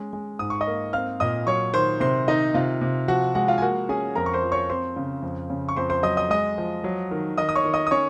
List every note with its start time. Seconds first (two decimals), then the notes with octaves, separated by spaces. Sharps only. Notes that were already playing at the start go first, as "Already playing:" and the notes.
Already playing: G#3 C#4
0.13 G#3
0.39 G#2 D#6
0.50 C#6
0.61 D#5 D#6
0.67 A#3
0.93 C4 F5 F6
1.20 A#2 D#5 D#6
1.47 F#3 C#5 C#6
1.74 D#3 C5 C6
2.00 C3 C5 C6
2.28 D#3 D#4 D#5
2.54 C3 F4 F5
2.81 C3
3.08 F3 F#4 F#5
3.35 G#3 F#4 F#5
3.48 F4 F5
3.58 G#5
3.62 A#3 F#4 F#5
3.89 C#4 G#4 G#5
4.15 F2 A#4 A#5
4.26 C#6
4.33 C5 C6
4.43 F3
4.52 C#5 C#6
4.69 C4 C5 C6
4.96 C#3
5.23 F2
5.50 C#3
5.69 C#6
5.76 F2 C5 C6
5.90 C5 C6
6.03 F#3 D#5 D#6
6.17 D#5 D#6
6.30 G#3 D#5 D#6
6.58 F3
6.84 F#3
7.11 D#3
7.38 D#3 D#5 D#6
7.49 D#6
7.56 C#5 C#6
7.65 D#3
7.74 D#5 D#6
7.87 D#6
7.91 C#4 C#5 C#6